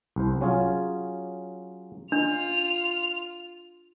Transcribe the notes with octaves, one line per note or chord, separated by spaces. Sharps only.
C2 C5
F#3 C#4 F4 G#4
D4 F4 F7